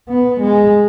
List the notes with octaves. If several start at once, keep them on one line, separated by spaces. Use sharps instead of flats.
B3
G#3